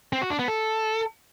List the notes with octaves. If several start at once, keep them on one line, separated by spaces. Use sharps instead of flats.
C4
F#4
D4
B3
A4